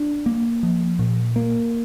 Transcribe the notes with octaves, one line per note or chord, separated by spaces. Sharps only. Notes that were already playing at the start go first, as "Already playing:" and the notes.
Already playing: D4
A#3
F3
A#2
A#3